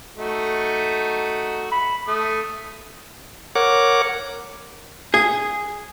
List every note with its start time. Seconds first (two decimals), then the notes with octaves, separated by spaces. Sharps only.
0.17 A3 D#4 F#4
1.71 B5
2.08 A3 D#6
3.55 A#4 C#5 F#5 D6
5.14 G#4